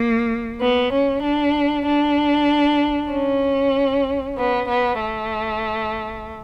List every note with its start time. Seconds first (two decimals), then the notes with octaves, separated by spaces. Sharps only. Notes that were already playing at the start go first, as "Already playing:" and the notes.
Already playing: A#3
0.61 B3
0.92 C#4
1.23 D4
1.86 D4
3.12 C#4
4.37 B3
4.68 B3
5.00 A3